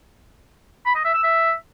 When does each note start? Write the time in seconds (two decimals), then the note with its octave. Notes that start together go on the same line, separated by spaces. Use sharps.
0.86 B5
0.95 D#5
1.05 E5
1.14 E6
1.24 E5